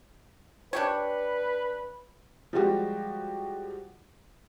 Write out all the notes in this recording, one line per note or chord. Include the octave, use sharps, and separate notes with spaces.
D4 G4 B4 C#5
F3 G3 G#3 F#4 G4